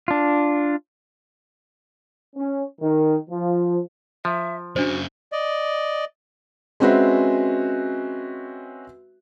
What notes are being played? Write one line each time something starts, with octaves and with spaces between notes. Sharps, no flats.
D4 F4
C#4
D#3
F3
F3 E5
F#2 C#3 D4 F#4 C5
D5 D#5
G#3 C4 C#4 F#4 B4 E5